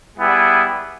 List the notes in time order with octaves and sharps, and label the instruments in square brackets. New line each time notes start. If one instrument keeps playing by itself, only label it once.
[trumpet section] G3 B3 E4 G#4